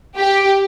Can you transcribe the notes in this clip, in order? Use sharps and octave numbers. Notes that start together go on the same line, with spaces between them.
G4